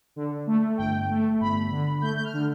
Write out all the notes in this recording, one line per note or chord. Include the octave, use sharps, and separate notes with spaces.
D3
A3
G1 G5
A3
G1 B5
D3
A3 G6
G6
F6
D3